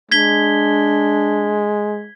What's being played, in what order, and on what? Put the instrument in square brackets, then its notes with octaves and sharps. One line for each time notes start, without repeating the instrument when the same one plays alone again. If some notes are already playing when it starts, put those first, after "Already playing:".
[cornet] G#3 [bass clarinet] D4 [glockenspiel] G#6 B6 G7